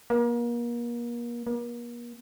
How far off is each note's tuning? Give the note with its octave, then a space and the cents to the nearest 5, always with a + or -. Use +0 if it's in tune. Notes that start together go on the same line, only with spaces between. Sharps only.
A#3 +35
A#3 +40